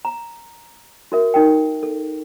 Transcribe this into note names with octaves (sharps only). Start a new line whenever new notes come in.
A#5
F#4 A#4 E5
D#4 A#4 G5
A4